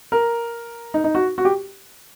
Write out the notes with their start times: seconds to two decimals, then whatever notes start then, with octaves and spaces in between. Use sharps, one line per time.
0.12 A#4
0.94 D#4
1.04 D#4
1.15 F#4
1.38 F#4
1.45 G4